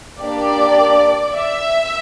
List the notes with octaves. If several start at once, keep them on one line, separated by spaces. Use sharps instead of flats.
A#3 D4 G4 D5
E5